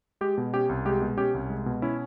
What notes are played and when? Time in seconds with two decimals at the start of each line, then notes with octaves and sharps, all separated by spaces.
0.21 G#3 G4
0.38 B2
0.54 C#4 G4
0.69 C2
0.85 G#3 G4
1.02 B2
1.17 C#4 G4
1.34 C2
1.50 G#3
1.66 B2
1.82 C#4 E4